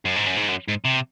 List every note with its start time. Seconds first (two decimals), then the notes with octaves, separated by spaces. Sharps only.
0.05 F#2
0.16 G#2
0.27 F#2
0.37 G#2
0.48 F#2
0.68 G#2
0.85 C3